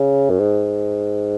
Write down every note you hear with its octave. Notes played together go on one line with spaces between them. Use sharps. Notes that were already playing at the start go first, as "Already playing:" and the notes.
Already playing: C#3
F#2
G#2